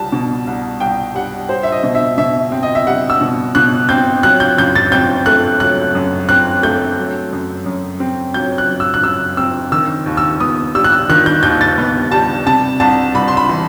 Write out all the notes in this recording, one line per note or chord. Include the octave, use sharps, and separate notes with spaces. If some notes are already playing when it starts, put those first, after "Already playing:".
Already playing: C2 G3 A5
B2
C2
C2 G5
G3 F#5
G3 C5
E5
D#5
B2
E5
B2 E5
C4
D#5
E5
G3 F#5
E6
B2
B2 F#6
C4 G6
F#3 F#6
G6
F#2 G6
A6
C4 G6
A3 F#6
F#3 F#6
F#2
C4 F#6
A3 G6
F#3
F#2
F#2
C4
F#3 G6
F#6
F#2
E6
F#6
F#2 E6
C4 E6
D#3 E6
D#2
E6
B3 D#6
G3 E6
F#6
E6
D#3 F#6
G6
D#2 G6
A6
B3
G3 A5
C3 A5
C2 A5
C2 B5
C6
B5
E3